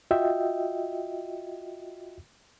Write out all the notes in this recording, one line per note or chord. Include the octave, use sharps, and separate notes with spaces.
F4 F#4 D#5 E5 G5